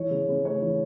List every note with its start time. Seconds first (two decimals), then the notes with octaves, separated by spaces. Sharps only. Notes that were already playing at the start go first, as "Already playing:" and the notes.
Already playing: E3 C#5
0.10 C#3
0.28 C#3
0.45 A3 C#5
0.62 E3